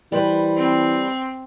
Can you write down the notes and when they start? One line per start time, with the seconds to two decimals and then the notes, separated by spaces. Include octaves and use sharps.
0.12 E3 G3 B4 C5
0.57 C4